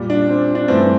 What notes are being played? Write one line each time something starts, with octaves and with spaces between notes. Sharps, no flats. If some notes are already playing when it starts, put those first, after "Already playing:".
Already playing: A#2 G3
D4
C4
D4
G2 E3 A3 C4